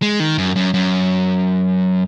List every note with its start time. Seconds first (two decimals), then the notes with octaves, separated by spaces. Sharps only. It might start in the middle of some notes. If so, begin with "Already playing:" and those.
0.02 G#3
0.20 D#3
0.38 F#2
0.56 F#2
0.74 F#2